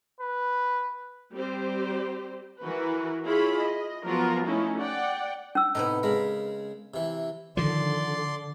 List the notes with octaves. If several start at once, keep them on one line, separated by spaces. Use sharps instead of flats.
B4
G3 C4 G4 C5
E3 F#4 A#4 B4
E4 F4 G#4 C#5 B5
D#5
F3 F#3 B3 F4 A#4
A3 C#4 D#4 E4
D5 F#5 G5
C#4 E6
A2 C3 B3 D#4
C#3 G#3 A#4 B5
C3 E3
D3 D#3 F3 D5 C6